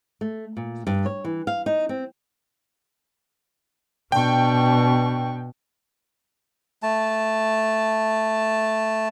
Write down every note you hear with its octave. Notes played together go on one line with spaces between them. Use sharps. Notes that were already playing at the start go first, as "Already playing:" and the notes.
A3
A#2
G2
C#5
E3
F5
D#4
C4
B2 D4 G5 C#6
A3 A5